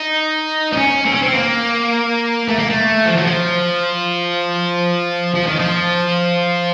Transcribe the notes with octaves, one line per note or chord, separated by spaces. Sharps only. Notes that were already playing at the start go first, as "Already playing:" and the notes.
Already playing: D#4
D#4
C#4
C4
C#4
C4
A#3
A3
A#3
A3
F3
F#3
F3
F3
D#3
F3